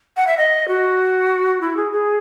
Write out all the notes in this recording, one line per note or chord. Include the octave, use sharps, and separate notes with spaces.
F#5
E5
D#5
F#4
E4
G#4
G#4